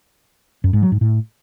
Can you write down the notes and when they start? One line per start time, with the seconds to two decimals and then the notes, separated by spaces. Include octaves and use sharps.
0.64 F#2
0.73 G#2
0.82 F#3
0.92 G#2
1.01 A2